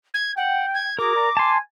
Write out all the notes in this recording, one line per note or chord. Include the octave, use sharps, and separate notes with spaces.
G#6
F#5 G5
G#6
F#4 G#4 A#4 A#5 D6
D5 A#5
G#5 A5 C6